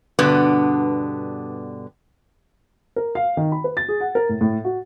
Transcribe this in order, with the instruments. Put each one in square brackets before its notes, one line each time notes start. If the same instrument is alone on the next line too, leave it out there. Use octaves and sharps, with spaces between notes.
[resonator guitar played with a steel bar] G2 B2 D3 B3 D4
[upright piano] A#4
F5
D#3
B5
B4
A6
G#4
F#5
A#4
A2
A2
F#4